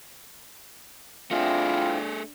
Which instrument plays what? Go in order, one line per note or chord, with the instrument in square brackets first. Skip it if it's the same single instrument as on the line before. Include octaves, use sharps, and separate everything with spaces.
[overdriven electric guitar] A3 G#4 [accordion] C4 E4 [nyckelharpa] D4 [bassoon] F4